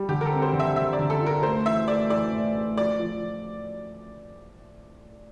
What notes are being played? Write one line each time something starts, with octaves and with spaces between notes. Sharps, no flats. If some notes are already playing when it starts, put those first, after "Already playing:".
Already playing: G3
D3 G4
A#4
A4
C4
C5
D3
E5
D3 E5
D5
D3
A4
F4
A#4
A3 C5
E3 E5
A3 D5
E3 D5
A2
A3
F3 D5
F3